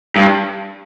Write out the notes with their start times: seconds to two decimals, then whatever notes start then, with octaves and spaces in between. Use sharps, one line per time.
0.16 G2